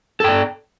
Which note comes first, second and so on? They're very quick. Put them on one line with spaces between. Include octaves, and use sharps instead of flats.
A4 G5 D5